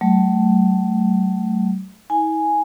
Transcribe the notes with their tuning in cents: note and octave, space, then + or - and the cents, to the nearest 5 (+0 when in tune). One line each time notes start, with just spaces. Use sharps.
F#3 +40 A3 +0
E4 -45 G#5 +0